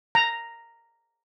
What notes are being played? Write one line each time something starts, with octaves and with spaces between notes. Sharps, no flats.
A#5